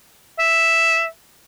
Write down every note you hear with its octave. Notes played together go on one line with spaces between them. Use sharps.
E5